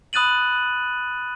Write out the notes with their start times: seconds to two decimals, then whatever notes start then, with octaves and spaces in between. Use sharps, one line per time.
0.13 B5 D#6 F#6 A6 D#7 F#7